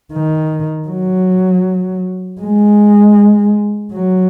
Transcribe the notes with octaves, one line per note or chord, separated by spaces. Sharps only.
D#3
F#3
G#3
F#3